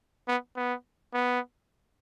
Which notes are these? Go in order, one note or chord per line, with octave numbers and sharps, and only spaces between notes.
B3
B3
B3